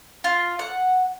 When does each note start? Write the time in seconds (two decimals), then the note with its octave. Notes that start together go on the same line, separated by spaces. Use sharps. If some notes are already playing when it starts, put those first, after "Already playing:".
0.24 F4
0.59 F#5